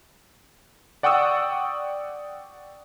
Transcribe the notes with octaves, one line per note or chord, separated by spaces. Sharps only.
D5 F#5 G5 C#6 D#6 E6